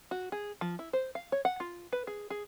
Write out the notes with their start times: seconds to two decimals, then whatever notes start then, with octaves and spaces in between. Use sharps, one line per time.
0.11 F#4
0.32 G#4
0.61 F3
0.79 E4
0.93 C5
1.15 F5
1.32 C#5
1.45 F#5
1.60 F4
1.93 B4
2.07 G#4
2.30 G#4